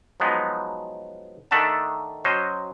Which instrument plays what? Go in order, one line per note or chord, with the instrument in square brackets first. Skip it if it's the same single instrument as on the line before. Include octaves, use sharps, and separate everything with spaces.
[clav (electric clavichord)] F3 F#3 G#3 B3 D#4
D#3 A3 D4 E5 F#5 A5
F#3 C#4 C5 D#5